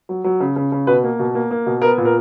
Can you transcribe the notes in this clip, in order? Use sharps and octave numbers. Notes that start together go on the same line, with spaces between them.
F#3
F#3
C#3
C#3
C#3
B2 B4
A#3
B2
A#3
A#3
B2
B3 A#4
A#2
A#4